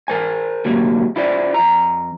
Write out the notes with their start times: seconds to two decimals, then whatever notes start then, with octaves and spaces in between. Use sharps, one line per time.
0.08 A#4 C5 G#5
0.65 D2 G#2 C3 F#3 A#3
1.16 E4 F4 C5 D5
1.54 F2 A#5